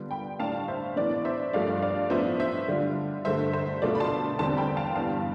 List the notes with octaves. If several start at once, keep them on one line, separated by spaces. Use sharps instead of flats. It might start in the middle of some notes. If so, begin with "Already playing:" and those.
Already playing: D3 G3 B3 F4
G5 B5
A2 G3 D4 F5 A5
C5 E5
A2 E3 B3 D5
C5 E5
G2 F3 A3 D4 F4 D5 F5
D5 F5
A2 F3 B3 D4 F4 C5 E5
C5 E5
D3 G3 D4 F4
G2 D3 A3 C5 E5
C5 E5
B2 A3 D4 F4 D5
B5
A5 C6
E2 D3 G3 C4 A5 C6
G5 B5
F5 A5
G2 E3 G3 B3 F5 A5